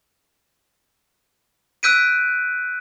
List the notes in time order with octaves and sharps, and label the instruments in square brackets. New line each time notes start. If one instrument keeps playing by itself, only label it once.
[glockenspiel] E6 F#6 G6 B6 D7 D#7